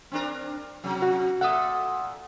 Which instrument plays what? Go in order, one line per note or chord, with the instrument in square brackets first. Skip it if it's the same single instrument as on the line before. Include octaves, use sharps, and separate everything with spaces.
[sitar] C4 D4 A#4
C3 F#3
[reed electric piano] F#4
[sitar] A#2 A4 E5 [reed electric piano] F#5 D#6